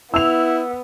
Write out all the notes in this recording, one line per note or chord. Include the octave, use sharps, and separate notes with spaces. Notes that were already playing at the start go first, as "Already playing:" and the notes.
B3 E4 E6 F7